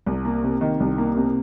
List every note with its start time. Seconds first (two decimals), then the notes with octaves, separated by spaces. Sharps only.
0.06 C2
0.25 A#3
0.44 C3
0.61 D#3
0.80 C2
0.98 A#3
1.17 C3